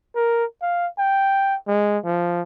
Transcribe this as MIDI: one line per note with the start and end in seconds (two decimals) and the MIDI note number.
0.16 0.45 70
0.62 0.88 77
0.99 1.56 79
1.68 1.99 56
2.05 2.42 53